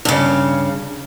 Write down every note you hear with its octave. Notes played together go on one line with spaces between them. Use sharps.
G2 C#3